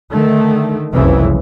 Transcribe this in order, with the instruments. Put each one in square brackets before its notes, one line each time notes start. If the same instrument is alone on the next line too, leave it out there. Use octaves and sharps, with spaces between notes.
[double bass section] D3 D#3 A3
F#1 C2 F2 C#3 E3